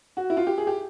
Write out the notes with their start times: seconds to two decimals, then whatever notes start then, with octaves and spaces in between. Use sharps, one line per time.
0.17 F#4
0.30 E4
0.37 F4
0.47 G4
0.58 G#4
0.67 G4